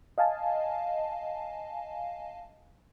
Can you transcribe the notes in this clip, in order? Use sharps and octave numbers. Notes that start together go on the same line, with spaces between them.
D#5 F5 G#5 A5